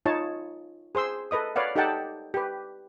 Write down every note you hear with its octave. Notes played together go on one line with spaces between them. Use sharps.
D#4 F4 C#5 A5
G#4 C5 C6 E6
A4 B4 D#5 D#6
B4 C#5 D5 F5 F#5
D#4 G4 A4 F#5 G5 A5
G4 B4